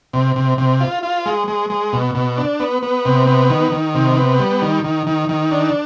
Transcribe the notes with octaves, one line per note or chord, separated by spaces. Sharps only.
C3
C3
C3
F4
F4
G#3
G#3
G#3
B2
B2
D4
B3
B3
C3
B3
D#3
D#3
C3
B3
G3
D#3
D#3
D#3
D#3
D4